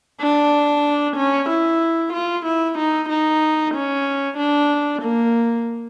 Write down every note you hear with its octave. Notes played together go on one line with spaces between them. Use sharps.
D4
C#4
E4
F4
E4
D#4
D#4
C#4
D4
A#3